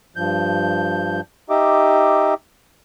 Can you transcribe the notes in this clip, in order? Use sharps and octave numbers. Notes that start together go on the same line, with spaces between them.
G2 F3 G6
D#4 G4 D#5 E5 D6